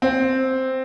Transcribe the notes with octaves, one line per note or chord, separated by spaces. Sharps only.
C4